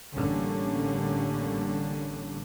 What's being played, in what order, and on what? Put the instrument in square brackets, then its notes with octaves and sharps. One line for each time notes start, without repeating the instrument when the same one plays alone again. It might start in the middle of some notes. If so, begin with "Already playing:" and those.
[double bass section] A1 D3 G3 A#3 C#4